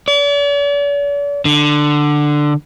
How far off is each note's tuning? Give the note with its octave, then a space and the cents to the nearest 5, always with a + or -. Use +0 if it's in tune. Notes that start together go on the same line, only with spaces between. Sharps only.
D5 -45
D3 +10